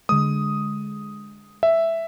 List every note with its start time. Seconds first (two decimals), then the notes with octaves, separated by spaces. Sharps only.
0.09 D3 G#3 D#6
1.63 E5